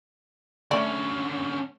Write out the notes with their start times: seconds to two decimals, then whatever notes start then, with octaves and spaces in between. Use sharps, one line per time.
0.71 D3 A3 C#4 D5 B5